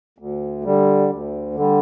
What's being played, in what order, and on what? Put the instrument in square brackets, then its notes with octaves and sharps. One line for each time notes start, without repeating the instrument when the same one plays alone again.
[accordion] D2
D3 G3
D2
D3 G3